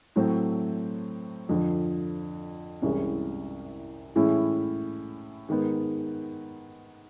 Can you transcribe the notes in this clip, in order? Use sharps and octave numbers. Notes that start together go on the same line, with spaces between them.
A2 F#3 A3 C4
F2 D3 F3
C2 C3 E3 G#3 C#4
A2 E3 G#3 C#4 E4
G#2 D#3 G#3 B3